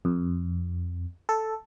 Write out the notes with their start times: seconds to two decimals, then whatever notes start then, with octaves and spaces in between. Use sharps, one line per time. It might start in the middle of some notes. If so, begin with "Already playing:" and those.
0.05 F2
1.29 A4